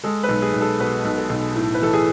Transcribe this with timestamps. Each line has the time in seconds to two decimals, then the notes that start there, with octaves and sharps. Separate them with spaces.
0.04 G#3 A4
0.23 B4
0.29 B1
0.42 G#4
0.54 B1
0.61 A4
0.80 B2 B4
1.05 B1
1.18 A4
1.29 B1
1.56 A2
1.74 B4
1.81 E3 A4
1.94 G#4